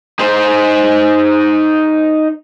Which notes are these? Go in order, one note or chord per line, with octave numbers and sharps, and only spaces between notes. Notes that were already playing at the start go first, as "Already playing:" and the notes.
D#4 C5